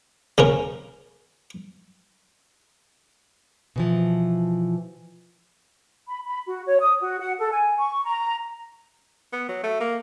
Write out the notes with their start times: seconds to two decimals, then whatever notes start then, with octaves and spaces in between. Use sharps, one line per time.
0.38 C#3 C#4 A#4
3.76 B2 E3 F3
6.08 B5
6.25 B5
6.46 F#4
6.67 C#5
6.80 D#6
7.01 F#4
7.20 F#5
7.39 A4
7.52 G#5
7.78 C#6
8.05 A#5
9.33 B3
9.49 F#3
9.64 A3
9.80 A#3